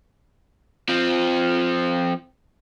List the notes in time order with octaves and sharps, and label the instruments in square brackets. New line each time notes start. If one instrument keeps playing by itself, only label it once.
[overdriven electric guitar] F3 C4